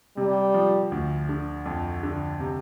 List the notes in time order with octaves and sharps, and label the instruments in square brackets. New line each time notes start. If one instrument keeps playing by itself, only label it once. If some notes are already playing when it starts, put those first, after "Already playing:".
[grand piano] C3 [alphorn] G3
[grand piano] F3
D2
D3
F2
D3
C3